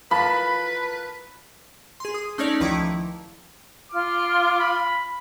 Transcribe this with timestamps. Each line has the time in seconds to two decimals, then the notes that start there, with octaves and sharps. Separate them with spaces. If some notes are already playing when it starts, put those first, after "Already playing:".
0.11 F4 A#4 B4 A5 B5
2.00 G#4 C6
2.14 D#6
2.38 A3 C#4 D#4 C#5 D5
2.60 C#2 D#3 F3 E4 A#5 D6
3.92 F4 D6 F6
4.60 B5